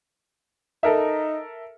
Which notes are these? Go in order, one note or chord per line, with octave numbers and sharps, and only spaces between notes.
D#4 A4 A#4 E5